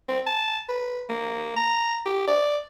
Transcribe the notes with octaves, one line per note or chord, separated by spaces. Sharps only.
C4
A5
B4
A#3
A#5
G4
D5